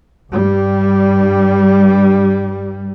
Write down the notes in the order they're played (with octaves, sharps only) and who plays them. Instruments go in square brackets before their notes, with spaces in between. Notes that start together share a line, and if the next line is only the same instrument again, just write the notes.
[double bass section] G2 G3